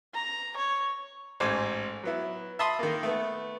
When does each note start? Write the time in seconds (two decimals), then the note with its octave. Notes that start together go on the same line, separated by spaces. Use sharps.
0.14 A#5
0.57 C#5
1.40 A1 G#2 C5 G#5
2.04 F#3 B3 E4
2.59 E5 A5 B5 C6 D#6 E6
2.79 D#3 A#3
3.03 A3 B3